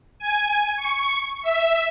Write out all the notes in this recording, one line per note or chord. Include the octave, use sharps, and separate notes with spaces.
G#5
C#6
E5